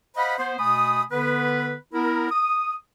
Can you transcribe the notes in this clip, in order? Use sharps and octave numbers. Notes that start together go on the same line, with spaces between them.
C5 D#5 F5 F#5 B5
B3 C5
B2 A3 G#5 B5 D#6
D3 B3 B4
B3 E4 A#4
D#6